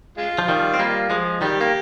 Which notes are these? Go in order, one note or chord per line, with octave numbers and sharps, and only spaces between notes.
G#3 F4
F3
D#3 G3
C4
G3 A#3
F3 G#3
D#3 G3 G4
A#3